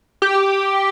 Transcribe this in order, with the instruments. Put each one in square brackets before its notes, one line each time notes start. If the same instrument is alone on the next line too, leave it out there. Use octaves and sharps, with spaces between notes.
[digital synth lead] G4